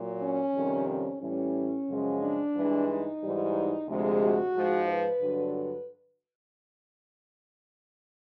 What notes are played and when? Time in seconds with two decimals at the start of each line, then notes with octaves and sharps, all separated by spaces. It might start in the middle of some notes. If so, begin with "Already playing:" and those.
Already playing: A#2 F#3
0.22 C#4
0.55 F2 C3 D#3 G3
0.89 C#4
1.22 A2 E3 G3 C#4
1.89 F#2 C#3 F3 G#3
2.21 D4
2.55 G2 E3 G#3
2.88 D#4
3.21 G#2 E3 G3
3.88 D2 C3 F3 G#3
4.21 F#4
4.55 G#2 F3 G#3
4.88 B4
5.21 G2 D3 F#3
5.54 B4